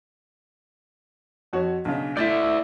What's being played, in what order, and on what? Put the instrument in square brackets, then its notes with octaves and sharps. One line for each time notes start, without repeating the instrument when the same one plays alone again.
[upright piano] F2 F#4 C#5
[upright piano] B1 C#3 [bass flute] D4
[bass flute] A3 [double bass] E4 [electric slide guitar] D5 E5 [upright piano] G6 A6 B6